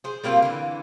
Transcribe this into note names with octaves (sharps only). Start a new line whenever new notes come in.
G#4 C5
G3 A#3 C4 F4
D3 E3